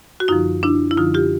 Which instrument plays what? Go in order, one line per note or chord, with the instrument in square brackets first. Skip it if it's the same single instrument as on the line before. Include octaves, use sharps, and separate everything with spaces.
[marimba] F#4
F#2 D3 F3 D#4 F4
D4 E4
E4
F#2 D3 F3 D#4 F4
F4 G4